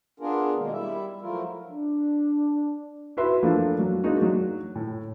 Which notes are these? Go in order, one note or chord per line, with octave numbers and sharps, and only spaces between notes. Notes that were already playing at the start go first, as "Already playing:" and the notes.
B3 D4 F4 G#4 A#4
B2 D#3 G#3 A#3
G3 E4 E5
F3 F#3 A3 E4 F4 A#4
D4
E4 F#4 B4 E5 C6
E3 F3 A3 A#3 D4
F#3
G#3 A#3 D4 D#4 F#4
F#3
A2